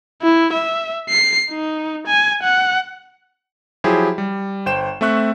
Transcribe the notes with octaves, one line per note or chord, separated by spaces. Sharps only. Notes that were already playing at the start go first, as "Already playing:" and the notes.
E4
E5
C7
D#4
G#5
F#5
F3 F#3 E4 G4 G#4 C5
G3
G1 C5 G5 E7
A3 C4 E5 C#6 F#6